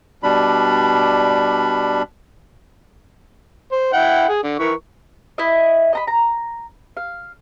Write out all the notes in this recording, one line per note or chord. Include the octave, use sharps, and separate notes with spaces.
B2 G3 D4 B5
C5
E4 F#5 G5
G#4
D3
E3 A#4 C#6
E4 D#5
D#5 A#5 B5
A#5
F5